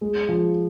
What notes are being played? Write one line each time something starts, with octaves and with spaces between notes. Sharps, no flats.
G#3
F3